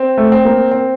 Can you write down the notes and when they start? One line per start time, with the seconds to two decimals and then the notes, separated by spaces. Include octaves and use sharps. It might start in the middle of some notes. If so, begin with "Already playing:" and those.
Already playing: C4
0.18 A3
0.32 C4
0.45 A#3
0.71 C4